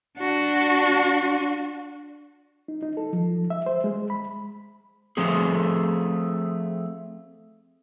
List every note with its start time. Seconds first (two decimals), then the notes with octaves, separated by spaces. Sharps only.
0.17 D4 F#4
2.68 D#4
2.83 D#4
2.97 A4
3.13 F3
3.50 E5
3.66 C5
3.84 G#3
4.10 B5
5.17 F3 A3 C4 G#4